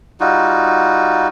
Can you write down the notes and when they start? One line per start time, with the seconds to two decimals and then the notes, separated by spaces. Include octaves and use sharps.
0.20 G3 D#4 F4 F#4